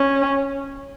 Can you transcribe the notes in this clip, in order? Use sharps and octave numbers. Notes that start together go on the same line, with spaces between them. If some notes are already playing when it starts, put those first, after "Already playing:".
Already playing: C#4